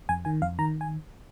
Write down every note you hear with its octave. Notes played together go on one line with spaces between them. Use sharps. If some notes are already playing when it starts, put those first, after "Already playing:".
F2 G#5
D#3 G#5
F2 F5
D#3 A#5
G#5